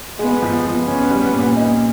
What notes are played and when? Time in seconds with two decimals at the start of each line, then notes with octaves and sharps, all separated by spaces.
0.19 G#3 B3
0.42 F3
0.65 F3 B3
0.87 C#4
1.10 G3
1.34 A#2
1.57 D#4